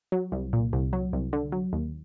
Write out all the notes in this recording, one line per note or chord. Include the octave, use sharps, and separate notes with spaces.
F#3
C2
A#2
C2
F#3
C2
D3
F#3
D#2